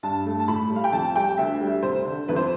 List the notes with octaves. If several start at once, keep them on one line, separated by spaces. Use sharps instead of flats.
G2 A5
A3
A5
A2 B5
G3
F5
G5
F2 A5
G3 G5
D2 E5
G3
F1 C5
D3
F2 B4
C5